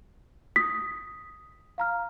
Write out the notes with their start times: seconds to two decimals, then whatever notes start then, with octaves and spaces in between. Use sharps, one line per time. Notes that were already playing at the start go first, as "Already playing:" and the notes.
0.56 D#6 B6
1.78 F5 A#5 F6